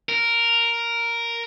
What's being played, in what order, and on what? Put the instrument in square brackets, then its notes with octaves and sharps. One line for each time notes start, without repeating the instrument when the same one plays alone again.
[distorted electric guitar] A#4